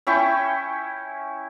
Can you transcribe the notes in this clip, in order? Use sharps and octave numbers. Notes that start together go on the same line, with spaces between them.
C#4 E4 G5 C#6